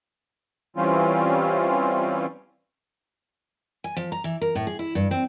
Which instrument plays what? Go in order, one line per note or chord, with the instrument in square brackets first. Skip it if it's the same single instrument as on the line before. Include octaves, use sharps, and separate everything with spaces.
[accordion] E3 G3 C4 C#4 F4
[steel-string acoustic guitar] G#5
F3
A#5
E3
A#4
A2
G#4
E4
G2
C4